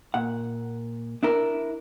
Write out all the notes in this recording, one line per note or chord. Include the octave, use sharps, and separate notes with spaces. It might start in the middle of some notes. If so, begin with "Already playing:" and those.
A#2 F#5
D4 E4 A#4